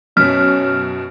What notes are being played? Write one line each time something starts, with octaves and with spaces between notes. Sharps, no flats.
F#2 B2 C#4 F6